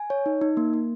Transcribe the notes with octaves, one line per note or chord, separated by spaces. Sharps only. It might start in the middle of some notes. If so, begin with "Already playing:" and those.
Already playing: G#5
C#5
D#4
D#4
A#3
A#3